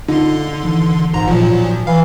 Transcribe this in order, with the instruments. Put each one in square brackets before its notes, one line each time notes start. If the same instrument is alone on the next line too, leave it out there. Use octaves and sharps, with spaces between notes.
[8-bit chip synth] D3 C6 [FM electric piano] D#4 F4
[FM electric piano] D#3 E3
[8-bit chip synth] G#1 A#5 [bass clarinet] G#2
[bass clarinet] A#2 [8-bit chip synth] F3 F#3
[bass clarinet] E3 [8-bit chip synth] F5